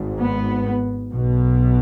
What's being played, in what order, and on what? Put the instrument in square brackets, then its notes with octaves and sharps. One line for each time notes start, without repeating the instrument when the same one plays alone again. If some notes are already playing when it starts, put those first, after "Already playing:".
Already playing: [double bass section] G#1 G#2
B3
B1 B2